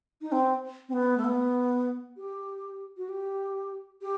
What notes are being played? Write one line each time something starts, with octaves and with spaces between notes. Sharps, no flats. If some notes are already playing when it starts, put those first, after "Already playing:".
D#4
C4
C4
B3
A3
B3
G4
F#4
G4
G4